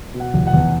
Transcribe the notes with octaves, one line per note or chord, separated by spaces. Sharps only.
B2
F#5
F1
F#5
E2